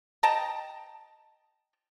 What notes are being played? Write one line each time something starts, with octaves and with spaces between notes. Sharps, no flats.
D#5 G5 A5 A#5